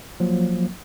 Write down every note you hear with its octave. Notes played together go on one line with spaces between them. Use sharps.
F3 F#3 A#3